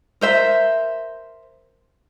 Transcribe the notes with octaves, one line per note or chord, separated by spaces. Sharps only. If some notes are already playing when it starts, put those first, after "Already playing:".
A#4 C5 E5